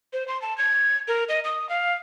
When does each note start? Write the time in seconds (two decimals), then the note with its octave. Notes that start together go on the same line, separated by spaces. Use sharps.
0.13 C5
0.28 C6
0.42 A5
0.58 G#6
1.08 A#4
1.29 D#5
1.45 D#6
1.69 F5